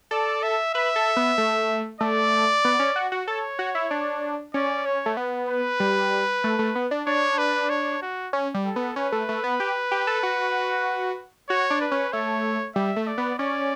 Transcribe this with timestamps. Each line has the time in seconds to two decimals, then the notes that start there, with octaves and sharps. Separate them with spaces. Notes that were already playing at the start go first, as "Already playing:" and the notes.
0.11 A4 D5
0.43 E5
0.74 B4 E5
0.96 A4
1.16 B3
1.38 A3
2.01 A3 D5
2.65 B3
2.80 C#4
2.96 F#4
3.12 F#4
3.28 A4 C#5
3.59 F#4
3.75 E4
3.91 D4
4.54 C#4 D5
4.86 C#5
5.06 A3
5.17 B3
5.49 B4
5.80 G3
6.44 A3
6.59 A3
6.75 B3
6.91 D4
7.07 D4 C#5
7.38 B4
7.70 C#5
8.02 F#4
8.33 C#4
8.54 G3
8.65 A4
8.76 B3
8.96 C#4 B4
9.12 A3
9.29 A3
9.44 B3
9.60 G4
9.91 G4
10.07 A4
10.23 F#4
11.49 F#4 C#5
11.70 D4
11.81 B4
11.91 C#4
12.13 A3 C#5
12.75 G3 E5
12.96 A3
13.07 D5
13.18 B3
13.39 C#4 D5